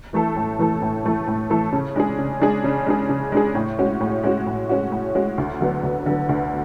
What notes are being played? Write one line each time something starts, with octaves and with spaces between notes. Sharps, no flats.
E3 A3 E4 A4
A2
E3 A3 E4 A4
A2
E3 A3 E4 A4
A2
E3 A3 E4 A4
C#3
G#3 D4 G#4
C#3
G#3 D4 G#4
C#3
G#3 D4 G#4
C#3
G#3 D4 G#4
A2
G#3 C#4 F#4
A2
G#3 C#4 F#4
A2
G#3 C#4 F#4
A2
G#3 C#4 F#4
D2
D3 F#3 B3
D2
D3 F#3 B3
D2